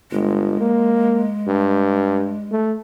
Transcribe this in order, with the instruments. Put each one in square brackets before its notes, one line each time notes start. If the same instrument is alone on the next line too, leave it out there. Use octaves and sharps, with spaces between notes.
[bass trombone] G1 [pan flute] G#3
[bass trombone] A#3
G2
A3